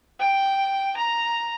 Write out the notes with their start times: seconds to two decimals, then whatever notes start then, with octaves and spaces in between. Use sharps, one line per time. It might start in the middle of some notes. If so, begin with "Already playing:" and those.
0.19 G5
0.97 A#5